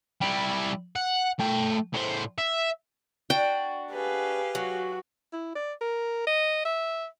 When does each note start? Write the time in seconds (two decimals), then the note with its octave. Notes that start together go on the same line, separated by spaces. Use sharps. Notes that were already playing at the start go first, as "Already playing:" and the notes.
0.21 G3 E4
0.96 F#5
1.39 A3 G5
1.94 A2 C5
2.38 E5
3.30 D4 F#4 G5
3.92 G4 G#4 B4 F5
4.55 F#3 F#4
5.33 E4
5.55 D5
5.81 A#4
6.27 D#5
6.65 E5